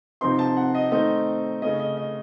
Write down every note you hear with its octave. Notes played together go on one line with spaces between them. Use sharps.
C3 F3 C4 D#4 C6
A5
F#5
D#5
D#3 A3 C4 D#4 D#5
C#3 A3 C#4 D#5
D#5
D#5